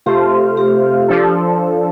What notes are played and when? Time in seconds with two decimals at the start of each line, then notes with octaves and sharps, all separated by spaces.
0.06 C3 A3 F4 G4 C5 F5
0.57 G4
1.08 F3 D4 A4